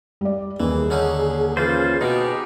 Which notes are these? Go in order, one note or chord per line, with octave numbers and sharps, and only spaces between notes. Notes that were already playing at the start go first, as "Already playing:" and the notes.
G3 D5
D#2 E3 G#4
D3 C#4 D#4
E3 C#4 F4 C5
B2 G#3 D#4 G4